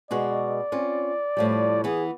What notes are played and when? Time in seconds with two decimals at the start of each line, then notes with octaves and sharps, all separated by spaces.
0.11 B2 G#3 F#4 D5
0.72 C4 C#4 F4
1.37 A2 F3 G3
1.84 E3 B3 G#4